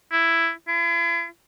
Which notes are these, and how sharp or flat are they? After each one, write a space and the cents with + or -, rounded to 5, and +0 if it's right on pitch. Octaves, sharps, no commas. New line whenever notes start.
E4 +10
E4 +45